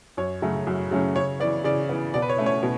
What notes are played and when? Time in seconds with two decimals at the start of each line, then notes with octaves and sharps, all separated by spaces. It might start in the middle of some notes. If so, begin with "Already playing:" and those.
0.17 F#2 C#5
0.42 C#3 F#3 A3 C#4
0.67 F#2
0.91 C#3 F#3 A3 C#4
1.16 C#3 C#5
1.40 B3 D5
1.43 E3
1.64 C#3 D5
1.89 E3 B3
2.14 B2 D5
2.22 B4
2.29 C#5
2.38 A3 C#4
2.46 C#5
2.63 B2